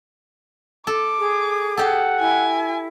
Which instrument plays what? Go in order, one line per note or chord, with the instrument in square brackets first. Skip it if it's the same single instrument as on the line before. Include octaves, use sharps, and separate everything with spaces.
[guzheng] A4 [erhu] D6
[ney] G#4
[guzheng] G4 A4 [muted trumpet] F#5
[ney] E4 [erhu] G#5